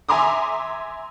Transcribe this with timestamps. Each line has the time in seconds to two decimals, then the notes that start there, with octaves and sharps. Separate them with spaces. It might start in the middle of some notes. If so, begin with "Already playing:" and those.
0.09 E5 G#5 A#5 C6 D6 D#6